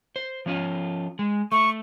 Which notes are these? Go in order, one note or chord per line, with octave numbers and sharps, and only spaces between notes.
C5
F3 C#4 F4
G#3
A3 C#6